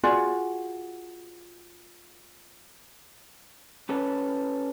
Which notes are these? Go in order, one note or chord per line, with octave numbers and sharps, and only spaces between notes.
F4 F#4 G#4 D5
C#4 G4 A4 B4 C#5